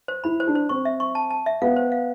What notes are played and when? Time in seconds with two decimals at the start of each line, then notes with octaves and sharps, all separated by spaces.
0.08 C5
0.24 E4 B5
0.40 C5
0.47 D4
0.55 C5
0.69 C4 C#6
0.85 E5
1.00 C#6
1.15 A5
1.30 A5
1.46 E5
1.62 B3 F5
1.76 C5
1.92 F5